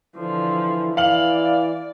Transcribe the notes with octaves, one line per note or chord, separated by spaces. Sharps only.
D3 E3 F3
E3 D5 F5 F#7